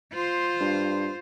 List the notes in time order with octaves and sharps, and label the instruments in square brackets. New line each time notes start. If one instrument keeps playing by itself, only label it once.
[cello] F4 C5
[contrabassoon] G2